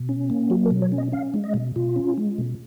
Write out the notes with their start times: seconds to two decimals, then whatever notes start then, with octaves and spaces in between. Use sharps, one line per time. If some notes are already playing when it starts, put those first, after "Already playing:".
Already playing: B2
0.09 C#4
0.30 A#3
0.50 F#3 F#4
0.66 A#4
0.71 B2
0.82 C#5
0.92 C#4
0.98 D#5
1.12 C#4 F5
1.34 G#3
1.44 D#5
1.54 B2
1.76 B2 F4
1.96 C#4
2.18 G#3
2.38 B2